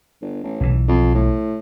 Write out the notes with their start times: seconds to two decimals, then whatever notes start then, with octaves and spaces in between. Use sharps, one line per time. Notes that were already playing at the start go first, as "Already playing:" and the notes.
0.22 G1
0.43 A1
0.61 B1 E3
0.88 F2
1.14 A2